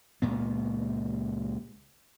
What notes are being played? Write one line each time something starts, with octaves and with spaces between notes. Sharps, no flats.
C#2 A#2 B3